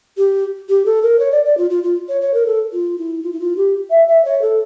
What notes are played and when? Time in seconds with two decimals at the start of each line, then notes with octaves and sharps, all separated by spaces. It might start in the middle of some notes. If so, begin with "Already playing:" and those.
0.17 G4
0.68 G4
0.85 A4
1.02 A#4
1.19 C#5
1.31 D5
1.44 D5
1.57 F4
1.70 F4
1.83 F4
2.08 C#5
2.21 C#5
2.33 A#4
2.46 A4
2.72 F4
2.97 E4
3.22 F4
3.32 E4
3.40 F4
3.56 G4
3.90 E5
4.08 E5
4.24 C#5
4.41 A4